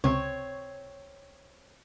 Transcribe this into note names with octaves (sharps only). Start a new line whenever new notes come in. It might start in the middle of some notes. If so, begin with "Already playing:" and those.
C#2 C3 C4 C#5